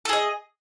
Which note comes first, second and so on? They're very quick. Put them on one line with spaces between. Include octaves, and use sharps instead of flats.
A4 G#4 D#5